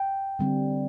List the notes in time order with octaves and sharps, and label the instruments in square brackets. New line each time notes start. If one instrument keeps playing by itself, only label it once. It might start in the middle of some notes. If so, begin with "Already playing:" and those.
Already playing: [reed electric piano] G5
[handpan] D3 G3 C4